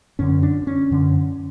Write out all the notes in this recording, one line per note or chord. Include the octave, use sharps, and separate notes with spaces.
F#2 D3 C#4
D4
C#4
F#2 D3